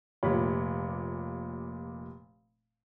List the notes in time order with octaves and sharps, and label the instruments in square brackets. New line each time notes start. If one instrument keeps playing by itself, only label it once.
[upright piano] F1 A#2 G4 C#5 B5